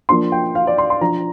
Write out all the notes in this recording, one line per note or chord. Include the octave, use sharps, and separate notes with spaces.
F3 A#3 D4 C6
G5
F5
D5
C6
C6
F3 D4 A#5